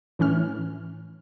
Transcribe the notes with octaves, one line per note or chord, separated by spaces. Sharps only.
A2 E3 C#4 F6